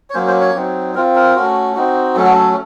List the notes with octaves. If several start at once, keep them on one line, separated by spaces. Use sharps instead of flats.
C#5
F#3 A#3 C#4 C5
C5
C#5
F#3 C4 D#4
C4 F4 A#4
A#4
A3 C#4 F#4
C4 D#4 F#4
F#3 A3 C#4 A4
F#4
A4